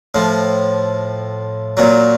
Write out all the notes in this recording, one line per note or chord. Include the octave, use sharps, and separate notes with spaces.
A2 F3
A#2 F#3